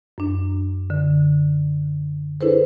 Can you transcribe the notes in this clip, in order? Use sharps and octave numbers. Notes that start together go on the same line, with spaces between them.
F#2 D4
D3
D4 E4 G#4 A4 B4 C5